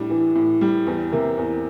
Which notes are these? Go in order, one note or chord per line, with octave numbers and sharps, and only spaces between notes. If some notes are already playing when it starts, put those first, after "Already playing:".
Already playing: A2 G3 D4
E3
A2
G3
E2
C3 A#3
E2